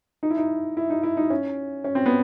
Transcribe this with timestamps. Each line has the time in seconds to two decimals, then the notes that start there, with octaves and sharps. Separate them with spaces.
0.23 D#4
0.30 E4
0.37 D#4
0.77 E4
0.90 D#4
1.03 E4
1.17 D#4
1.30 C#4
1.84 C#4
1.95 C4
2.06 B3